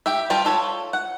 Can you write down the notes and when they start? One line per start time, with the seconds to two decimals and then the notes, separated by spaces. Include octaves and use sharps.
0.06 G4 E5
0.30 G3 F4 G4 A5
0.45 F4 A4 C#5
0.93 F#5